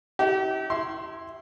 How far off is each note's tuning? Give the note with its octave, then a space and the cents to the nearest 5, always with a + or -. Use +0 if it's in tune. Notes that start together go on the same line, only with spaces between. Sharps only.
E4 -40 G4 -35
E4 +0 C6 +0